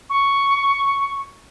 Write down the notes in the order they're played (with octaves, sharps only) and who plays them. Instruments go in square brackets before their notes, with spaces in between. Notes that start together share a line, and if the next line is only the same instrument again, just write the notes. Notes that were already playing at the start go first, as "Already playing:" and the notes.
[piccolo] C#6